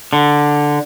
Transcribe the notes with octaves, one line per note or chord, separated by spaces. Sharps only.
D3